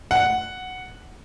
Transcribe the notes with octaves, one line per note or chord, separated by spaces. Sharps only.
F#5